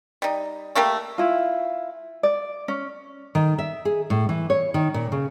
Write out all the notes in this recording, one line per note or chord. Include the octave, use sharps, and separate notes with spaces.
G3 D#4
A3 A#3 G4 A4
E4 F4
D5
C#4
D#3
E5
G#4
A2
E3
C#5
D#3
A#2
C#3